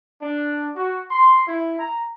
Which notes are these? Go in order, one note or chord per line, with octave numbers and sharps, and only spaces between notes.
D4
F#4
C6
E4
A#5